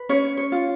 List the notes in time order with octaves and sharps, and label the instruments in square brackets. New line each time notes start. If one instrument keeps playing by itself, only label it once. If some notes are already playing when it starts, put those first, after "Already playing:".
Already playing: [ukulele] B4
C#4 C#5
C#5
F4